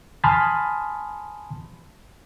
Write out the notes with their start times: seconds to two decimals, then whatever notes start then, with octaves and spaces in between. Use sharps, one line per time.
0.24 G#5 A5 B5 C6 D#6 F6